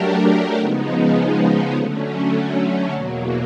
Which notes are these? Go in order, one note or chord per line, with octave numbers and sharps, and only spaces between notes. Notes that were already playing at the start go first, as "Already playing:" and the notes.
Already playing: F#3 A3 D4 G4 A#4
C#3 F3 G#3 B3 D#4
D3 F#3 A3 C#4
E2 B2 F#3 A#3